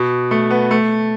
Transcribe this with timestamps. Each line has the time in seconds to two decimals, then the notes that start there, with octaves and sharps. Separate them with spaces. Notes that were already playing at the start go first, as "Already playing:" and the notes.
Already playing: B2
0.31 A3
0.51 B3
0.71 A3